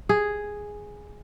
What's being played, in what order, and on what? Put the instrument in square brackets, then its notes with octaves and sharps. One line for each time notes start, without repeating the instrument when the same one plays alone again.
[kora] G#4